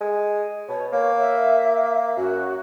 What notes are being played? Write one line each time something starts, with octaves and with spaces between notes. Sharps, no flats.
G#3
B2 C#5
A#3 C#5
E5
F#2 F#4